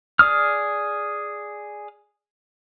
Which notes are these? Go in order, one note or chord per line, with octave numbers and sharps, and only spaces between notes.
G#4 D5 D#6 F6